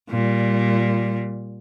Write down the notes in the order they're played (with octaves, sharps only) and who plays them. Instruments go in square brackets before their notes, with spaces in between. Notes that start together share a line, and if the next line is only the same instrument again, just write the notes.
[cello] A#2 G3